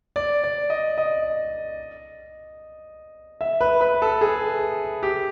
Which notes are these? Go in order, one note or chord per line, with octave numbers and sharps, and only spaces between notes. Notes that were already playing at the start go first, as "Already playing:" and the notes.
D5
D5
D#5
D#5
E5
B4
B4
A4
G#4
G4